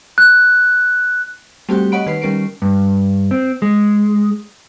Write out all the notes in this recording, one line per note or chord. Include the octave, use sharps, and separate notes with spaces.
F#6
G3 A3 C4 F#4 G4 G5
C#5 D#5 F#5 B5 D7
D#3 B4 C7
D#3 G3 C#4 A#4 C7 D7
G2
C4
G#3